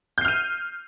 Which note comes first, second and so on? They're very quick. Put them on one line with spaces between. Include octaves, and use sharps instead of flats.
G6 C7 F6 D#7